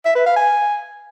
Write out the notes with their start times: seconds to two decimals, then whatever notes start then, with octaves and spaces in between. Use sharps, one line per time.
0.05 E5
0.15 B4
0.26 F5
0.36 G#5